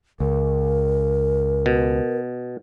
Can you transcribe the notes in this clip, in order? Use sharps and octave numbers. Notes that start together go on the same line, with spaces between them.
C#2 A#4
B2